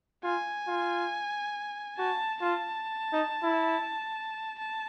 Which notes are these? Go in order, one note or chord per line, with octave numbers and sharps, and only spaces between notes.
F4 G#5
F4
F#4 A5
F4 A5
D#4
E4
A5